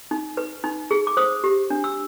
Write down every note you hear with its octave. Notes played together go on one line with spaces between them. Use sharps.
D#4
B4
D#4
G#4
D6
C5 D#6
G4
D4
E6